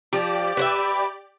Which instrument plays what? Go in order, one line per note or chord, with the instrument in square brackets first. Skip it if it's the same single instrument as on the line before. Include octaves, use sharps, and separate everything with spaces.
[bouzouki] F3 [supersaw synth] G4 D5 D6
[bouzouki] B4 C5 E5